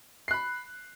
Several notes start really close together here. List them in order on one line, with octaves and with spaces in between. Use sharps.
C7 F#6 B5